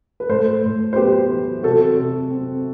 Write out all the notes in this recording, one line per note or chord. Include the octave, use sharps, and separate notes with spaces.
B4
A2 A4 C5
A2
C5
B3 G4 B4
E3
C3 F#4 A4
C3
C4